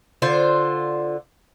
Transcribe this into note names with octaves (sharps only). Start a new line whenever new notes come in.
D3 F4 C5